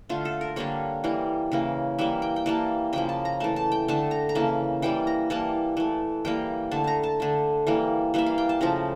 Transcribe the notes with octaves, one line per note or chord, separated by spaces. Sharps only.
D3 A3 F4
A4
A#4
D3 G3 A#3 C#5
E3 G3 A#3
C#3 E3 A#3
E3 G3 A#3 E5
G5
G5
E3 G3 A#3 A5
C#3 F3 A#3 G5
A5
A#5
E3 A3 A5
A5
G5
D3 A3 A5
A#5
A#5
C#3 E3 A#3 A5
E3 G3 A#3 G5
A#5
E3 G3 A#3 A5
E3 A3
E3 G3 A#3 G5
D3 A3 A5
A5 A#5
A5
D3 A3
E3 G3 A#3
E3 G3 A#3 E5
F5
G5
A5
C#3 F3 A3 A#5